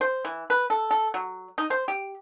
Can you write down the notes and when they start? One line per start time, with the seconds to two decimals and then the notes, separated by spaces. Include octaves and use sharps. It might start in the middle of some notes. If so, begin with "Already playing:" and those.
0.01 C5
0.25 E3
0.50 B4
0.70 A4
0.91 A4
1.14 F#3
1.58 D#4
1.70 C5
1.88 G4